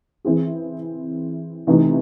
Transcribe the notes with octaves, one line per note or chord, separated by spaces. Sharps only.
E3 C4 E4 G#4
C3 E3 A3 D#4